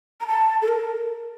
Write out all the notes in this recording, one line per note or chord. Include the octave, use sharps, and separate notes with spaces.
A#5
A5
A4
A#4